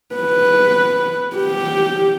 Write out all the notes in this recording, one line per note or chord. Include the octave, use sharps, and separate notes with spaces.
B4
G4